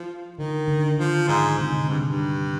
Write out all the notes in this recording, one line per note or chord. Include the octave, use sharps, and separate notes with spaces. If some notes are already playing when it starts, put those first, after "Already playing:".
Already playing: F3
D3 D#3
D3
D#3 F3
G#2 D3
G#2 C3
D3
C3
G2
G2